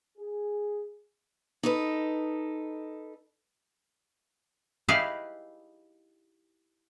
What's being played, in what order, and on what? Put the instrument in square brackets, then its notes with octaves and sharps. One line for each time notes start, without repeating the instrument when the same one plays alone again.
[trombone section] G#4
[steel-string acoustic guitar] D#4 A4 B4
[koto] D#4 E4 G4 G#4 B4 F5